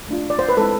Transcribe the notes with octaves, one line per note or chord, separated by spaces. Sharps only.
A3 D4 F4
D5
C5
B4
G#3 C4 E4 A4